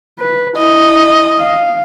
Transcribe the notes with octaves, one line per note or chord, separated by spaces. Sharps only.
B4
E4 D#5
F5